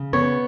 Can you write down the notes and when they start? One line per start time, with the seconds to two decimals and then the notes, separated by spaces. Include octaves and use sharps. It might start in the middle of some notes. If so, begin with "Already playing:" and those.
Already playing: C#3
0.13 B3 C#5